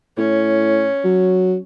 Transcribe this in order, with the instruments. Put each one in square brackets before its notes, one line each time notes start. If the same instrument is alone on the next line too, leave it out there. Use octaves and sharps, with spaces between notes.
[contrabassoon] A2 [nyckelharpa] C#4
[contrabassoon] F#3